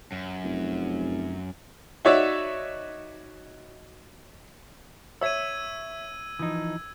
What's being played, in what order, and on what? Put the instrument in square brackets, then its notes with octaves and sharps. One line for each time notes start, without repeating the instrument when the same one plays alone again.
[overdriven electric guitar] F#2
[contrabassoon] F1
[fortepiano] D#4 F#4 C#5 D5 E5
[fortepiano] C#5 E5 [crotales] E6 G#6 D#7
[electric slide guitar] E3 F3 D#4 [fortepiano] D#6